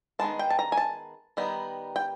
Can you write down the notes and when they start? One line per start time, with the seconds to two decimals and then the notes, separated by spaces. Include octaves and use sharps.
0.19 D#3 G#3 B3 A5
0.39 G5
0.50 A5
0.59 A#5
0.72 G#5
0.77 A5
1.37 D#3 G3 B3 D#4
1.96 G5